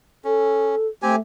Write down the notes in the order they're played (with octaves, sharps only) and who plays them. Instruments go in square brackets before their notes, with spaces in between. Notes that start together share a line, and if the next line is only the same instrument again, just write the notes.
[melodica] C#4 [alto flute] A4
[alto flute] A3 [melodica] C4 G4 G#5